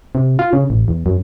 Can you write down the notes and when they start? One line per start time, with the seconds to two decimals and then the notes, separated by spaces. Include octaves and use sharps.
0.15 C3
0.39 F4
0.53 C#3
0.70 A1
0.88 E2
1.06 F#2